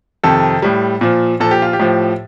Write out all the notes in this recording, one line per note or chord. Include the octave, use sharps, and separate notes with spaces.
F2 C3 D#3 A4
A2 G3
A#2 F3
A#2 F3 A4
G4
F4
G4
A2 F3